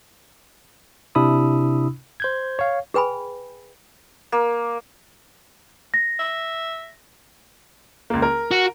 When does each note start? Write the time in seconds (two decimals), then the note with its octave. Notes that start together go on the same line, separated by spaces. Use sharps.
1.15 C3 D4 E4 B5 D#6 E6
2.20 C5 G6 G#6
2.59 C#5 F5
2.94 G#4 B4 G5 G#5 B5
4.32 A#3
5.94 A#6
6.19 E5
8.10 C#2 A#3
8.22 A#4
8.51 F#4